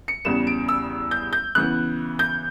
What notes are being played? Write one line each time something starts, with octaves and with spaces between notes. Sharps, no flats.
C#7
E2 C#3 G3 B3 E7
D7
E6
G6
G6
C#3 E3 B3 F#6
G6